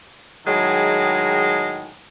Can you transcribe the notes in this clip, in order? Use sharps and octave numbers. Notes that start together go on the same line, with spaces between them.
A2 D#3 F#3 G#3 G#4